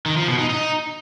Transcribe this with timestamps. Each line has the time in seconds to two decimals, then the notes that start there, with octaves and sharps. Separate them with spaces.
0.06 D#3
0.17 F3
0.28 B2
0.38 D#4
0.49 D#4